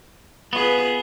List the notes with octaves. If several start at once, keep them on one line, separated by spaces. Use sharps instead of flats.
B3 F4 G#4 B4